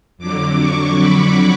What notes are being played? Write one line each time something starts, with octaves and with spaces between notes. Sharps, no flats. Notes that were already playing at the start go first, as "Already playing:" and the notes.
F2 D3 F#3 D6
C#6
B5